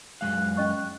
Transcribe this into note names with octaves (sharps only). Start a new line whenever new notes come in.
F#2 G#3 F5 F#6
C#4 D#5 C#6